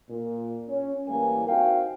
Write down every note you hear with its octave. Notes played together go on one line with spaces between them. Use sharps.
A#2
C#4
A2 E3 G3 A#3 A#4 G#5
C4 D#4 F#4 F5 G5